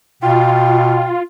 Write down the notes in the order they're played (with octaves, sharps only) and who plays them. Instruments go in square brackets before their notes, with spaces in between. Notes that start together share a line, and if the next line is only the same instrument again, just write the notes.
[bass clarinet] B2 [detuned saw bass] F4 [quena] G5